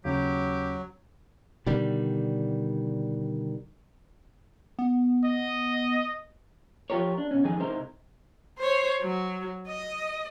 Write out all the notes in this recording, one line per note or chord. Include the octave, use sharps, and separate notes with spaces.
D#2 C#3 F#3 G4
B2 D3 D#3 G3
B3
D#5
F3 F4 G4 A#4 C#5
D4
B2 C#4
F2 D#3 G#3 G#4
C3 G#3 D#4 E4 A#4 C5
C5 C#5
F#3
D#5